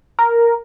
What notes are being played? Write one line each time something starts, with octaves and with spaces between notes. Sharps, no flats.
A#4